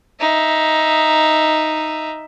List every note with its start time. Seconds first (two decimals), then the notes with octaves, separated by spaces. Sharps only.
0.20 D#4 E5